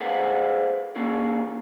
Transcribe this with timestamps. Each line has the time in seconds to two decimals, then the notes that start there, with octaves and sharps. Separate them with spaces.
0.01 G#4 B4 C5 D5 F5 F#5
0.96 A#3 C#4 F4 G#4